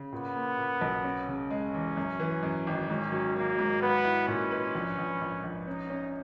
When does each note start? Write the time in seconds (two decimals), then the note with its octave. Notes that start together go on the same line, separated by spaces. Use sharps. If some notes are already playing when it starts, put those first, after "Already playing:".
Already playing: C#3
0.12 A#2 B3
0.36 A#3
0.58 A#2
0.81 B1
1.04 C#4
1.28 C#3
1.50 G#3 C#4
1.74 E2
1.97 F#2
2.20 E3
2.43 F#2
2.67 G#1
2.90 G#2 C#4
3.12 F#3
3.36 F#3 A#3
3.58 G#2
3.82 B3 B4
4.04 E4
4.28 A#2 C#4
4.51 B4
4.75 A#1
4.98 A#1
5.21 A#1
5.43 A#1
5.67 C#4 D#4
5.90 C#4